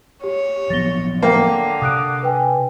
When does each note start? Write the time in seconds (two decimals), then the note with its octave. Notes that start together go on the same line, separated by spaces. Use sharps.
0.24 G4 C#5
0.70 F3 F#3 B3 A6 A#6 G7
1.23 D3 A#3 F5 G5 A#5
1.82 C3 D#6 F#6 D7
2.23 B4 G5 G#5